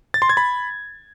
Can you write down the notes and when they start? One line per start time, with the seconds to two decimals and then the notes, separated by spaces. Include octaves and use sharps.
0.14 A6
0.22 C6
0.29 G#6
0.37 B5